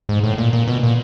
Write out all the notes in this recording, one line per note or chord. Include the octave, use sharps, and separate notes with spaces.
G#2
A2
A#2
A#2
B2
A#2